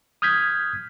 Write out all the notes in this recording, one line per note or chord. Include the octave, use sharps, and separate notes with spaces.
D#6 F6 G6 G#6 B6